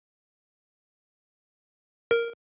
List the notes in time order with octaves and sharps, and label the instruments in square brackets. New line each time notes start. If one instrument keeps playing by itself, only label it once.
[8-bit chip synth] A#4